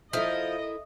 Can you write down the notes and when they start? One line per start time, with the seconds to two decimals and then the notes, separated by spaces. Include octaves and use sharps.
0.13 F3 E4 A4 A#4 D#5 E5